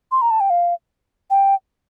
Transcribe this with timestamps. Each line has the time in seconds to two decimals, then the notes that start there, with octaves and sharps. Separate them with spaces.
0.12 C6
0.22 A#5
0.31 A5
0.40 G5
0.50 F5
1.31 G5